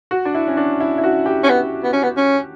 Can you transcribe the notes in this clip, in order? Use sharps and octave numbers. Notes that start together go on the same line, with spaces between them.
F#4
D4
E4
C#4
D4
E4
E4
F#4
G4
C#4
B3
B3
C#4
B3
C#4